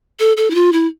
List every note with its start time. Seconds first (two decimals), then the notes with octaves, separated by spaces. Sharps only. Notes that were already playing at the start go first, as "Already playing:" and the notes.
0.20 A4
0.37 A4
0.50 E4
0.55 F4
0.73 E4